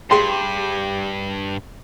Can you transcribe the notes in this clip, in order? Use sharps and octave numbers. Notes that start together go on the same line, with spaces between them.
G2 G4 G#4 G5 C6